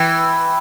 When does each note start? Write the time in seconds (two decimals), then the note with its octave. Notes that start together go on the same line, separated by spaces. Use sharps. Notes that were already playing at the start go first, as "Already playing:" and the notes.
Already playing: E3 G5